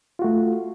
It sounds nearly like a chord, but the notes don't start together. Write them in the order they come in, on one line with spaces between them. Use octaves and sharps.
F4 F#4 A3